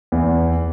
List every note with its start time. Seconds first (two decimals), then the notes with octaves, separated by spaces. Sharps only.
0.12 E2